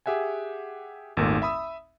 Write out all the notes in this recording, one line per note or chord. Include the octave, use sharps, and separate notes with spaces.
G4 G#4 E5 F#5 G#5
G#1 D#2 A#2 A3
E5 B5 D#6 E6